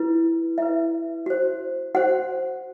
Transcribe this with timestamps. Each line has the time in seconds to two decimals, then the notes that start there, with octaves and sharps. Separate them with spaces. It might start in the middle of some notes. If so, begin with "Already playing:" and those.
Already playing: E4 B4
0.58 E4 B4 E5
1.26 F#4 C5
1.95 F#4 C5 F#5